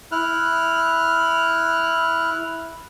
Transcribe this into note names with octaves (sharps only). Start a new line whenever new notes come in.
E4 F6 F#6